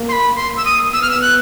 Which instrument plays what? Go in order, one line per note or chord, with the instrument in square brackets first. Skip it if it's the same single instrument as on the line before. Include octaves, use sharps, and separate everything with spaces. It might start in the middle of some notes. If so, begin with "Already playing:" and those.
Already playing: [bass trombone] A#3
[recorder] C6
B5
[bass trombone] A#3 [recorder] C6
[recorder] E6
D#6
[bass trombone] B3 [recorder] E6
[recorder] F6
E6
F#6